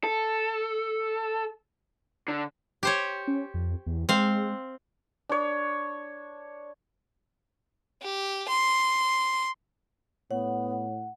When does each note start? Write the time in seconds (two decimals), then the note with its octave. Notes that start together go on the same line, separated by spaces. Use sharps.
0.04 A4
2.28 D3
2.83 G4 C5 C#5
3.28 C#4
3.54 F2
3.86 E2
4.09 G#3 C4 F5
5.29 D4 C#5
8.02 G4
8.49 C6
10.31 A2 B3 C#5 F#5